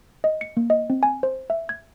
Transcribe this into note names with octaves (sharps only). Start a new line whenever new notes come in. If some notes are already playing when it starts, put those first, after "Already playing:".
D#5
C#7
A#3
D#5
C4
G#5
C5
E5
G#6